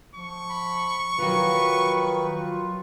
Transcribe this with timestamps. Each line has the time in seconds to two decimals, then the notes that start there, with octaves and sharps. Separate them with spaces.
0.15 F3 C#6
0.49 B5
1.18 D#3 F3 F#3 B4
2.37 F4